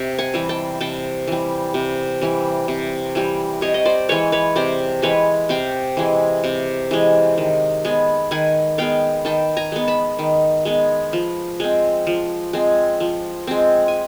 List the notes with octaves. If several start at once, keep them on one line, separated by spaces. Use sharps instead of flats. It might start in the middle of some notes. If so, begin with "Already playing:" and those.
Already playing: C3 E5
F#5 G#5
E3 G3
G5 A5
C3 G5 A5
E3 G3
C3
E3 G3
C3
E3 G3
C3 C#5 D#5
D#5
C5 D5
E3 G#3 B4 C#5
B4 C#5
C3 C5 D5
E3 G#3 B4 C#5
C3 F5 G5
E3 G#3
C3
E3 G#3
D#3
G#3 B3
D#3 F#5 G#5
G#3 B3 F5 G5
D#3 G5 A5
G#5 A#5
G#3 B3
A5 B5
D#3
G#3 B3
F3
G#3 C4
F3
G#3 C4
F3
G#3 C4
G#5